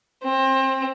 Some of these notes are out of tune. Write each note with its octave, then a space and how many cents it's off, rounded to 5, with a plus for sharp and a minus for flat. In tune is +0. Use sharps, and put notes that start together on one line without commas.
C4 +25